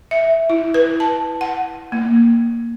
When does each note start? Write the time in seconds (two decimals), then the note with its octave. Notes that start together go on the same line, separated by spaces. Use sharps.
0.11 E5
0.50 E4
0.74 B4
1.00 A5
1.41 F#5
1.92 A#3